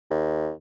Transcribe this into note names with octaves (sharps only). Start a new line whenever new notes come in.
D#2